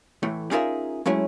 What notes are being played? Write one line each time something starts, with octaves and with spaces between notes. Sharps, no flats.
A2 E3 A3
C#4 D#4 F4 G#4 A#4 E5
F#3 G#3 A3 C#4 E4